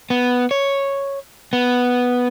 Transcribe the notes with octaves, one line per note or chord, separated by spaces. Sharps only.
B3
C#5
B3